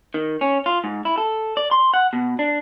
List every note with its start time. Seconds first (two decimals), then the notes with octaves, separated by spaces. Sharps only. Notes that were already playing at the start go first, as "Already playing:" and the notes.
0.14 D#3
0.41 C#4
0.66 F4
0.84 G#2
1.05 E4
1.18 A4
1.57 D5
1.71 C6
1.94 F#5
2.13 B2
2.39 D4